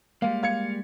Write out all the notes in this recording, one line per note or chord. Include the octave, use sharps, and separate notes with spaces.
G3 G#3 A#3 F5
F5 G#6 C#7